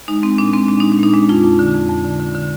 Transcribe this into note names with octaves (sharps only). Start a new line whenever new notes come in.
G#3 D#4
G#3 C4
A#2 D4
G#3 C4
G#3 D4
G#3 D#4
D4
A#2 D#4
G#3 D4
F2 F4
F2
D3
F2
F2
D3
D3
D3